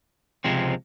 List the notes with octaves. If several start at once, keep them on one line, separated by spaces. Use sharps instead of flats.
C#2 C3 F3 G#3 C4